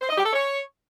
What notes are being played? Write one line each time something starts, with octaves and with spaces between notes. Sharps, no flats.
C5
D#5
G4
A4
C#5